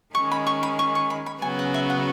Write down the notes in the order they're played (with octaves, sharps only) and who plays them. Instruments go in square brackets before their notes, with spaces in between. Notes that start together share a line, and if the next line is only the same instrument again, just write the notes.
[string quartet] D#3 G#3 C#4 [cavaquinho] C#6
[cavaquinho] B5
C#6
B5
C#6
C#6
B5
B5
[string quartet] C#3 F#3 B3 F#4 [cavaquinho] G#5
[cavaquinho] F#5
E5
F#5